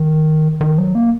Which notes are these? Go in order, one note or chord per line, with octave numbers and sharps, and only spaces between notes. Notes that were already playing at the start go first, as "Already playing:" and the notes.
Already playing: D#3
D#3
F#3
A#3